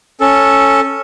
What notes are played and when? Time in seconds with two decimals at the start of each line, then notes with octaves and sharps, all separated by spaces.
0.21 C#4 A4